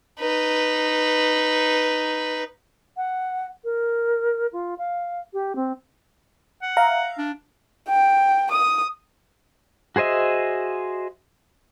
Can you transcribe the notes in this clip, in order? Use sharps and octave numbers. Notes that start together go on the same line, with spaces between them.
D#4 B4
F#5
A#4
F4
F5
G4
C4
F#5
E5 F5 A#5
D4
G5
D#6
F#4 G#4 C5 D#5 E5